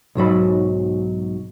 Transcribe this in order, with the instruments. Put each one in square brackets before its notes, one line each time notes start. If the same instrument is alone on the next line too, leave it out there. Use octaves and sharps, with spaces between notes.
[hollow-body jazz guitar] B1 G#2 F#3 B5